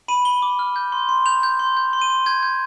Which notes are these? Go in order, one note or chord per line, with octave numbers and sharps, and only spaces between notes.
B5 D#7
B5 G7
D6
F6
G6
C6
C6
G6 F7
G6
C6
G6
C6
D#7
C6
G6 G#6
G6